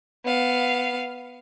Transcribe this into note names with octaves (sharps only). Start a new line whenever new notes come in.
B3 F5